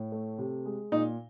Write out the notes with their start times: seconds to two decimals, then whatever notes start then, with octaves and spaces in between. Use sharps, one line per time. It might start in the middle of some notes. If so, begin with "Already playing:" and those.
Already playing: A2
0.12 A3
0.38 C3
0.65 G#3
0.92 A#2 D#4